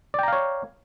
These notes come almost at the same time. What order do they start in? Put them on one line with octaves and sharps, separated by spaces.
D5 G5 A#5 F5 C#5